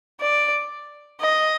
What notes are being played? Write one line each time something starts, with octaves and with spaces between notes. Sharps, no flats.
D5
D#5